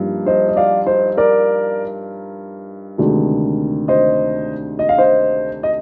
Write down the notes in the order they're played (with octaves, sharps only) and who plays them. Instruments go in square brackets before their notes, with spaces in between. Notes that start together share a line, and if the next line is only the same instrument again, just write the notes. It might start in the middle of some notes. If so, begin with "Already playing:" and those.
Already playing: [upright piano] G2 F3 A#3 D#4
C5 D#5
D#5
D5 F5
C5 D#5
A#4 D5
D2 C3 D#3 G#3 D4
C5 D#5
D#5
F5
C5 D#5
D#5